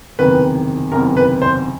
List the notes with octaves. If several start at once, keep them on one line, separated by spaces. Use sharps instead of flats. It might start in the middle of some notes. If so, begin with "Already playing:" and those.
F#1 E2 C3 D#3 B4
F#1 E2 C3 D#3 A#4
B4
C5